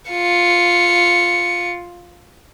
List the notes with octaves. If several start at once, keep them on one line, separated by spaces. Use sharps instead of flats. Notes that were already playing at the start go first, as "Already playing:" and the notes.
F4 C#7